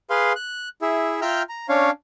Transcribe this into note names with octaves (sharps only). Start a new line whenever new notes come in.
G#4 B4 F5 C6
F#6
E4 G#4 E5
F4 E5 G5 A#5 F6 G6
A#5
C#4 D4 C#5 F5